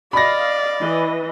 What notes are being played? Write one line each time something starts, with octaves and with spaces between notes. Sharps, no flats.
D5 D#5 F5 B5 A#6
E3 B4 D#5